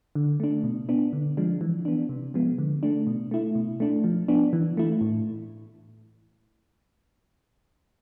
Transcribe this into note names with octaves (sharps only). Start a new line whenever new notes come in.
D3
A3 D4
B2
B3 D4
D3
F3 G#3 D4
E3
B3 D4
C3
F3 G#3 B3
D3
A3 D4
B2
A3 E4
B2
A3 D4
F3
B3 D4
E3
A3 E4
A2